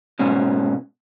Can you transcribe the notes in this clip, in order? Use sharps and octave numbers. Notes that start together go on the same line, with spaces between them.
G#2 B2 C#4